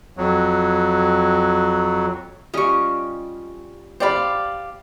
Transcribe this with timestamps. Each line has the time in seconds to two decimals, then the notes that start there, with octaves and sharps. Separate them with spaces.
0.17 F2 F#3
2.54 G3 C#4 F4 D#5 C#6
4.00 G4 C5 D5 F5 B5